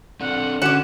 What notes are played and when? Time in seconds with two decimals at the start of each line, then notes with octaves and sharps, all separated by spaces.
0.21 C4 D4 A4 F#5
0.62 D3 C#4 F#4 F#5 D6 E7